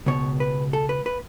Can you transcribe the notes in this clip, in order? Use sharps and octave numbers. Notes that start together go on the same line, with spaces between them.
C#2 B2 C#5
B4
A4
B4
B4